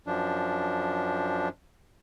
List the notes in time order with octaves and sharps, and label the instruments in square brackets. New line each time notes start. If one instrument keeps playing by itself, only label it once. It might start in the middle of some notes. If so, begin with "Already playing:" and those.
[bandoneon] F#2 F3 D4